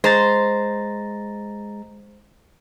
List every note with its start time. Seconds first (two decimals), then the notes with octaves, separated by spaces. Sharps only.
0.04 G#3 C5 A#5 A6